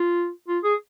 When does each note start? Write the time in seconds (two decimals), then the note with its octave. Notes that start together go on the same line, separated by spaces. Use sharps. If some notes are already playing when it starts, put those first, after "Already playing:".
Already playing: F4
0.48 F4
0.64 G#4